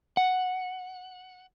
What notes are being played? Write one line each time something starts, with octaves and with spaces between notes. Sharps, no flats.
F#5